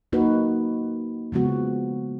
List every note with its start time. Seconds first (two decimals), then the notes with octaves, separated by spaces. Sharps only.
0.13 A#3 D#4 F#4 B4
1.32 C#3 F3 G#3 B3 F#4